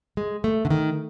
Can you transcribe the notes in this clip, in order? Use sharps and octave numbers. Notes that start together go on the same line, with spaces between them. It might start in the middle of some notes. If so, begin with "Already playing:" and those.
G#3
A3
D3
D#3